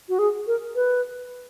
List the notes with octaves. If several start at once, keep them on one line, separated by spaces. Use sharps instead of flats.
F#4
G#4
A#4
B4